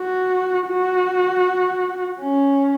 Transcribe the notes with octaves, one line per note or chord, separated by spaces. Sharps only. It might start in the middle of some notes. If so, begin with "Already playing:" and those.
Already playing: F#4
F#4
C#4